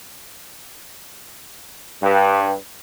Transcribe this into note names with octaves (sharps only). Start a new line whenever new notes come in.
G2